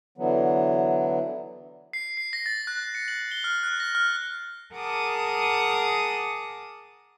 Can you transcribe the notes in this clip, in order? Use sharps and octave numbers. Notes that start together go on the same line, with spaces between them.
D3 E3 F#3 B3
C7
C7
A#6
A6
F#6
C#7
F#7
G7
F6
F#6
A#6
F6
G#4 A#4 F#5 A5 D6 D#6